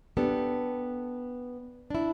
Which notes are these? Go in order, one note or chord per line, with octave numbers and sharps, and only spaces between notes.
B3 D4 G4 A4
D4 E4